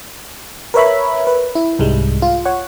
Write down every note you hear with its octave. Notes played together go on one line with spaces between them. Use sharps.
A#4 B4 C#5 E5 B5
B4
E4
C2 G#2 G3 G#3
F4
C#5 F#5